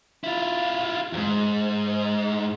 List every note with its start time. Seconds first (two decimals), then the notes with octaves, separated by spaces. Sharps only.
0.24 E4 F4
1.13 E2 G#2